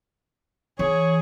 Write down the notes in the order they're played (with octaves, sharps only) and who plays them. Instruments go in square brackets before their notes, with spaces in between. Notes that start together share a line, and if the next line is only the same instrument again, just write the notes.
[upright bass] E3 [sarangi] G#4 [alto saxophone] C#5